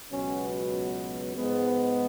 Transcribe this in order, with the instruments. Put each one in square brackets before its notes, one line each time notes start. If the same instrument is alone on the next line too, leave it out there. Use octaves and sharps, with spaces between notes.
[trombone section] C#2 B2 F#3 B3 C#4
G#2 F3 G#3 B3